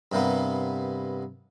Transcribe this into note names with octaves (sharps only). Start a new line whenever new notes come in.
G2 C3 A#3 B3